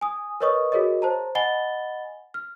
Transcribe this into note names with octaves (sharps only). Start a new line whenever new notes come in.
G#5 D#6
A#4 B4 C#5 D#5 C#6 D#6
F#4 G#4 A#4 C#5 D#5
C5 A5 A#5
D#5 F#5 G#5 B5 A6 G7
F6